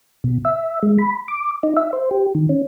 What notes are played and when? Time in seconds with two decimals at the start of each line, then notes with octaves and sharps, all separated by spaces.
0.24 B2
0.45 E5
0.83 G#3
0.99 B5
1.28 D6
1.63 D#4
1.77 E5
1.93 C5
2.11 G4
2.35 D#3
2.49 C#4